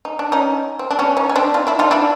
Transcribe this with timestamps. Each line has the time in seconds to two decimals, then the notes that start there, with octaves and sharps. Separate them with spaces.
0.05 D#4
0.19 D4
0.32 C#4 D#4
0.79 C4
0.91 D4
0.99 B3 C#4
1.17 C#4 D#4
1.30 C#4
1.36 C4 D4
1.54 D#4 F4
1.67 D4 E4
1.79 D#4 F4
1.91 D4 E4